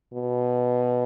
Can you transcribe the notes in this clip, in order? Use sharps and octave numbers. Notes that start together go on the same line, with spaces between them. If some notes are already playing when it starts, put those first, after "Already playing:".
B2